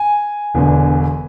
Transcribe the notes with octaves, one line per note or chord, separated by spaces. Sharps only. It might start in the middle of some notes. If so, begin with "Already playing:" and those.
Already playing: G#5
E1 E2 D3